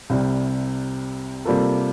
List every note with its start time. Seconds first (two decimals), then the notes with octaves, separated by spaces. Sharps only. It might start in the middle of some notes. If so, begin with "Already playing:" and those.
0.10 C2 C3 G3
1.45 C3 G3 A#3 F4 A4